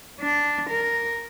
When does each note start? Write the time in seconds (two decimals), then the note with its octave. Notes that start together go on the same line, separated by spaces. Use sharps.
0.20 D4
0.70 A#4